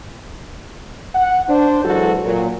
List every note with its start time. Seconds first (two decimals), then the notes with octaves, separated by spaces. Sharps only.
1.15 F#5
1.49 D4 C5
1.84 E3 F#3 G#3 F#4 A4
2.25 A#2 F#3